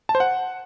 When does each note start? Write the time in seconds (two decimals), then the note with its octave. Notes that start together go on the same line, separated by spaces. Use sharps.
0.09 A5
0.15 C5
0.20 F#5